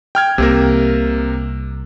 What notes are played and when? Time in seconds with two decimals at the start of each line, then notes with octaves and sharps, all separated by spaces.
0.15 G5 F6 G#6
0.38 C2 C3 A#3 A#4